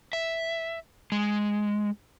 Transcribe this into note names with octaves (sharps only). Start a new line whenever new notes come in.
E5
G#3